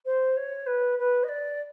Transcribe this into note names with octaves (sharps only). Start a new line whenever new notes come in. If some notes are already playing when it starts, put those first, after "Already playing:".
C5
C#5
B4
B4
D#5
D5